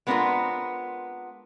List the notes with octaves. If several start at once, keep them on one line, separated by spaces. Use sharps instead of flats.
G#3 B3 C4 D4 F4 A#4